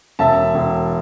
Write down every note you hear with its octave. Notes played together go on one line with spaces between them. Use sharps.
E1 E5 A5
E1